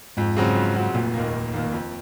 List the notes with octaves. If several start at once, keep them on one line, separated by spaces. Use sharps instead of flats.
F2 G#2
C#3 F#3 C4 F#4
F2
C#3 F#3 C4 F#4
F1 A#2
D#2 D#3 A#3
F1
D#2 D#3 A#3
F2